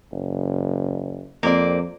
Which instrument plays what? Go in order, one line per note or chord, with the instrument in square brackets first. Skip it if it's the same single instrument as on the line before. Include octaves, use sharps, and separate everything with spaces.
[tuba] F#1
[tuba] F2 [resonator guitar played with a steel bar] A#3 C4 D5